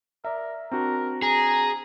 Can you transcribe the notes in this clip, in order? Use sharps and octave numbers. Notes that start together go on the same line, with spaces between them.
A#4 D5 E5
C4 D4 F#4 A#4
G#4 A#5